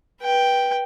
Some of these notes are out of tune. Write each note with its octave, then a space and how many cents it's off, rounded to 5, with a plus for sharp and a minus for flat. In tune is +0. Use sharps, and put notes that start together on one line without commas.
B4 -20 G5 +0